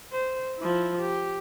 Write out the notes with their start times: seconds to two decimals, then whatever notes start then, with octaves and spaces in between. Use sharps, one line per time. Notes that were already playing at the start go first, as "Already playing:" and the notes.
0.12 C5
0.58 F3 E4
0.99 G4